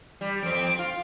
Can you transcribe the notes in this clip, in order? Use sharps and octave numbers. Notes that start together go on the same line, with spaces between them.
G3
F2 C4 D7
F4 F5